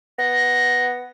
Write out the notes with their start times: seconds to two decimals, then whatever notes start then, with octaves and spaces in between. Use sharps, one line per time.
0.19 B3 A#6